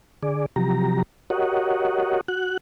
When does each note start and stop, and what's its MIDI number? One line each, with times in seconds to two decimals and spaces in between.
0.23 0.46 50
0.23 0.46 68
0.23 0.46 74
0.56 1.03 48
0.56 1.03 53
0.56 1.03 54
0.56 1.03 67
0.56 1.03 82
1.30 2.21 66
1.30 2.21 67
1.30 2.21 70
1.30 2.21 73
1.30 2.21 75
1.30 2.21 78
2.28 2.57 66
2.28 2.57 90